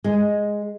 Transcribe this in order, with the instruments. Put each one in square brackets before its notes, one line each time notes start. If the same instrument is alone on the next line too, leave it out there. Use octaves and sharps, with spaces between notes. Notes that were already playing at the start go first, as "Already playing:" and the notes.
[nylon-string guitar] G#3